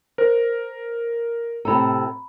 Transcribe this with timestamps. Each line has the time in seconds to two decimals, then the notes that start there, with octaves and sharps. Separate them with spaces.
0.18 A#4 C5
1.65 A2 C3 A4 A#5 B5